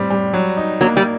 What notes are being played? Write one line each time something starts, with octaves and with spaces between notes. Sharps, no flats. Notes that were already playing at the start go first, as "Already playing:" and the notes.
Already playing: A2 G3 C4
G3
F#3
D#4
F#3 A#3
G3